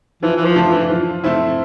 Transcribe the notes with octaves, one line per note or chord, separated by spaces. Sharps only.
E3 F3
E3
F3
A3 D4 F4 C5
E3
F3
A3 C4 E4